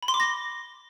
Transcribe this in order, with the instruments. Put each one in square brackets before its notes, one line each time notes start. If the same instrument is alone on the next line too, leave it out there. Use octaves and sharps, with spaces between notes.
[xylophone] B5
C6
D6
A#6